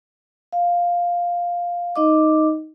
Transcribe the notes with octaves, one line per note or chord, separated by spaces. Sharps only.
F5
D#4 D#5 D6